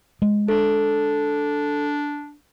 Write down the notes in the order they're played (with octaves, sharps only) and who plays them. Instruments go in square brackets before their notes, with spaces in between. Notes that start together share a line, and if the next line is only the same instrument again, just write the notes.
[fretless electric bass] G#3
[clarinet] D4 [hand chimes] A4